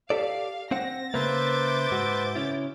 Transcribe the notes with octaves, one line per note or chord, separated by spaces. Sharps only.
G4 A4 D5 F5
C4 C5 F#5 A#6
C#3 A#3 B4 C5 E5 D6 G6 A6
G#2 F#4
C#3 C#4 E4